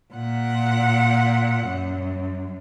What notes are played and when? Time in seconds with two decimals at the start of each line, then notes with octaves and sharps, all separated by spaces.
0.14 A#2 F#5
1.67 F#2